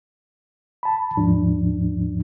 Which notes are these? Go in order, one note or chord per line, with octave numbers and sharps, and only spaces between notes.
A5 B5
D#2 G#2 F3 D4